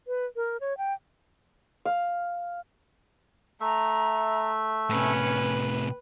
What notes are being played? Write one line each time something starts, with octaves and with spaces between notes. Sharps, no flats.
B4
A#4
C#5
G5
F5
A3 E5 A#5
A2 C3 C#4 B4